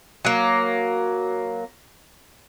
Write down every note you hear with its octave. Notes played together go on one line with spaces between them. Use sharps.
F#3 A#3